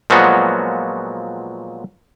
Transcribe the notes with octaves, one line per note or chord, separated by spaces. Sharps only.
A#2 F3 F#3 G#3 B3 F#4